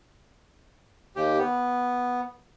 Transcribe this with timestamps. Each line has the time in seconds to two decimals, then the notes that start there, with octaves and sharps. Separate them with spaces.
1.16 D#2 G4
1.38 B3